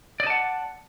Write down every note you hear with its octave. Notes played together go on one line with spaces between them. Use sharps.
D5 D#5 F#5 A5